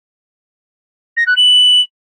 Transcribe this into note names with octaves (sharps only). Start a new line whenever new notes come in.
A#6
F#6
F#7